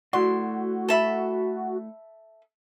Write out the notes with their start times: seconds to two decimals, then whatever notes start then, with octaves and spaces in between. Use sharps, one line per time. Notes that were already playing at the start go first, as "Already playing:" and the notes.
0.13 A3 E4 F#4 D5 C6
0.89 A4 E5 B5